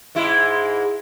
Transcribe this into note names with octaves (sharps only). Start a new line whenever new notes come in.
G#2 G#3 E4